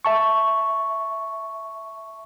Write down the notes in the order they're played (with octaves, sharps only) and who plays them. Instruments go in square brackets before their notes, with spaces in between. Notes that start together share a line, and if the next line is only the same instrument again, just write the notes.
[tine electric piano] E5 A5 C#6